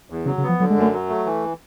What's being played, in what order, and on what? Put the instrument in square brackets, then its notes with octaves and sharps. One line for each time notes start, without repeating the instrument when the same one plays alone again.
[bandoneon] E2
[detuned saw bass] C#3 [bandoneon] F#3
[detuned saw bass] C#3
[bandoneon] B3
[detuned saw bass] F3
[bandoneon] D3 [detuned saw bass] F#3
[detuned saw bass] G#3
[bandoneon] F#2
[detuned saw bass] A3
[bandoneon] F#3
A3
E3